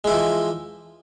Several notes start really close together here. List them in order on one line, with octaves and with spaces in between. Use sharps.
G#3 E4 E3 F3